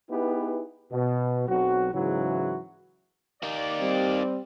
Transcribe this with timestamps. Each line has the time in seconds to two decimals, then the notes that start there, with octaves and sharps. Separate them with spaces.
0.10 B3 D#4 E4 G4 G#4 B4
0.92 B2
1.48 B1 F#3 C4 F#4
1.94 G#2 C#3 E3 F#3 E4 F#4
3.42 A#3 D#4 D5
3.81 G3 C4